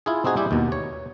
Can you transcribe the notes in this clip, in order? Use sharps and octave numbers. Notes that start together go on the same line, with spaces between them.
E4 F4 G#4
C4 D#4 F#4 G#4
G3 E4 G4
D#2 B2
C#5